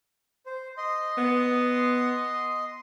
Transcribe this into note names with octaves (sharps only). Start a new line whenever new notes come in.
C5
D#5 C6
B3